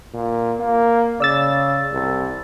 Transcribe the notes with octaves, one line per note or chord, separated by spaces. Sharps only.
A#2
A#3
C#3 D5 E6 A6
C2